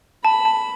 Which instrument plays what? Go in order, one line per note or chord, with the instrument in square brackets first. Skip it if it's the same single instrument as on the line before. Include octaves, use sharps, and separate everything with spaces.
[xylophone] A5 [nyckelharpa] B5
[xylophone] A5